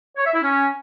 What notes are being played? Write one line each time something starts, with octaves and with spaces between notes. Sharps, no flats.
C#5
E5
E4
C#4